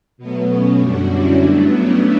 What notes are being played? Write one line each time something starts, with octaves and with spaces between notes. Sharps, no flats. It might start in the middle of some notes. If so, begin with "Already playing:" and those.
B2 F#3 A3 B3
C#4
F#2 D3 G3 D4 F#4
C#4 E4
G2 F#3 A3 B3 D4
C#4 E4